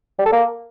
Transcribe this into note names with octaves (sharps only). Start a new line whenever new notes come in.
G3
A4
A#3